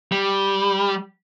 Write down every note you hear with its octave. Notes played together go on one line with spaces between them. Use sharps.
G3